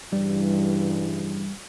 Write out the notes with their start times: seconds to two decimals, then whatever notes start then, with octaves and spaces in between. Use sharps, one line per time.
0.13 G2 C#3 E3 G3